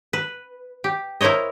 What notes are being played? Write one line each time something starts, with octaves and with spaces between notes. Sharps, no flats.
B4
G4
E4 A#4 C5 C#5 D#5